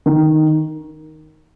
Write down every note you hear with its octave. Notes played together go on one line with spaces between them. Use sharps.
D#3